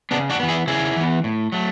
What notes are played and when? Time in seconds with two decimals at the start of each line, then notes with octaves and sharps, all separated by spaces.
0.11 C#3 B3 D4
0.30 D4 F#4
0.40 E3 B3
0.48 E4 G#4
0.67 C#3 E4 G#4
0.96 E3 B3
1.24 A2
1.52 F#3 A3